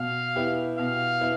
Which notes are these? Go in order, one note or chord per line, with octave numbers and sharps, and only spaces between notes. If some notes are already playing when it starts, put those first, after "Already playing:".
Already playing: B2 F5
B3 E4 G4
B2 F5
B3 E4